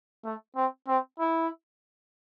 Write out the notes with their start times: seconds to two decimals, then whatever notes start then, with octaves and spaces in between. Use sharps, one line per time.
0.24 A3
0.56 C4
0.88 C4
1.20 E4